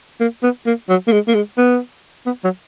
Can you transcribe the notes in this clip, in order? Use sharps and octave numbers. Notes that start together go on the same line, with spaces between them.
A#3
B3
A#3
F#3
A#3
G#3
A#3
G#3
B3
B3
F#3